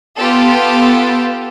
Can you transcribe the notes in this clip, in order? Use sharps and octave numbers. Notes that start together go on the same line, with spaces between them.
B3 F4 G4 A4